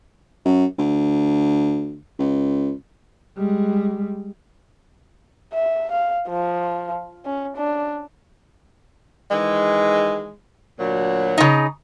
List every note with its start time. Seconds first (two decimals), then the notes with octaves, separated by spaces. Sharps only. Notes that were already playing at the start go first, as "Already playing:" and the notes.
0.45 F#2
0.78 D2
2.19 C#2
3.38 G3 G#3
5.53 E5
5.91 F5
6.28 F3
7.25 C#4
7.56 D4
9.31 D#3 E3 G#3
10.80 D2 A#2 F#3
11.38 C#3 D#4